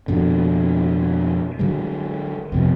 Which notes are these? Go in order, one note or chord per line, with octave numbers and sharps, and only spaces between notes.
F2 B2 D3
D3 F#3 G#3
F2 C3 B3